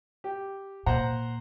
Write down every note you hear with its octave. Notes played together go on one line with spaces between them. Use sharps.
G4
A#2 C5 F#5 A#5